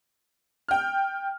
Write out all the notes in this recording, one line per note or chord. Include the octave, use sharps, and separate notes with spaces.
G5 F6